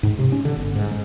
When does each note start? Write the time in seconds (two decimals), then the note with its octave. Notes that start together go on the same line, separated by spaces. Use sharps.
0.03 G#2
0.19 C3
0.32 C#4
0.45 D3
0.56 G1
0.75 G#2
0.91 G#3